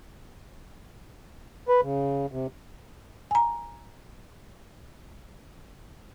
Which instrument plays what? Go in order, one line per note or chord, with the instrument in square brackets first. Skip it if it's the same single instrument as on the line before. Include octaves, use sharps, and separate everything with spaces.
[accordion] B4
C#3
C3
[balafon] G#5 A#5